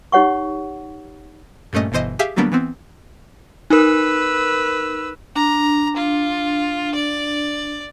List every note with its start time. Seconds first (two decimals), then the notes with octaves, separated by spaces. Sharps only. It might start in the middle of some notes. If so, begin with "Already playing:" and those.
0.12 D#4 G4 C#5 F#5 C#6
1.73 G2 A#2 A3 C#4 D#5
1.92 G1 B2 E3 C5 D#5
2.19 G4 G#4 E5 F5 D6
2.36 D3 F#3 G3 A#3 B3 D4
2.52 E3 B3 C4
3.70 D#4 A#4 B4 E6
5.36 D4 A#5
5.97 F4
6.95 D5